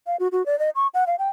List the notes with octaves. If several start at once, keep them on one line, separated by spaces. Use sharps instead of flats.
F5
F#4
F#4
D5
D#5
C#6
F#5
F5
G5